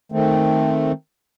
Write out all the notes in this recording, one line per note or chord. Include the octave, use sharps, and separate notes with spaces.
D#3 A3 C4